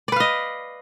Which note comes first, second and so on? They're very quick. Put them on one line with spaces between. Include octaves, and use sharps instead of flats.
D5 B4 F5 D#5